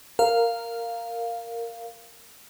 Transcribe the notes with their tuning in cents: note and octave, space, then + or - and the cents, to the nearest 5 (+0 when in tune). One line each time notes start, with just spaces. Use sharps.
A#4 -10 F5 +0